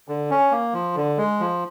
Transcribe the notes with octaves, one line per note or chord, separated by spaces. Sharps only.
D3
C#4
A#3
F3
D3
G#3
F3